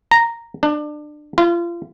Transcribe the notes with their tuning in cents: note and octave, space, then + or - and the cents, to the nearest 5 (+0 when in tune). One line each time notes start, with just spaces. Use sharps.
A#5 -5
D4 +25
F4 -30